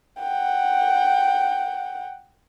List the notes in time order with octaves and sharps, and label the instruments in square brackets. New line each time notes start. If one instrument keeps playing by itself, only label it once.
[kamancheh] F#5 G5